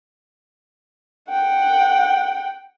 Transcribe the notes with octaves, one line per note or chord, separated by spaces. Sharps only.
F#5 G5